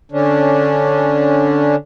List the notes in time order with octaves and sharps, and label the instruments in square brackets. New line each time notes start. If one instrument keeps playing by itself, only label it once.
[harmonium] D3 C#4 D4